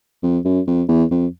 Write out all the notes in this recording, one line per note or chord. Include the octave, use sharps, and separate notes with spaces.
F2
F#2
F2
E2
F2